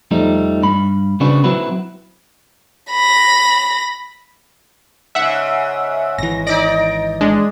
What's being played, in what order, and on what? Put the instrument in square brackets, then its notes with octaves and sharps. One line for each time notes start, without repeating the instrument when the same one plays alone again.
[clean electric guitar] F2 F3 G3 A3 D#4
G2 B5
C#3 C4 D4 F#4 G#4 B4
F#3 C4 E4 F#4 B4
[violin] B5 A#6
[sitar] G#2 C#3 [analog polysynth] E5 F#5
[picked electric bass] G#1 E3 [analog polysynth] A#6
[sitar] D#4 D5 [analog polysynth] A#6 D7
[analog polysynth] G#3 D4